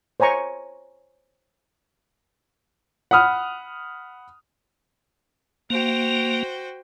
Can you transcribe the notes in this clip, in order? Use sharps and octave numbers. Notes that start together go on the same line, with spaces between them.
C5 C#5 G#5 A#5 C#6
F#5 B5 D#6 F6
A#3 F#4 C5 G5